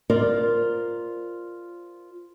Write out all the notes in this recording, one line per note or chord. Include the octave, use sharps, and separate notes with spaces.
F4 A#4 C5 D5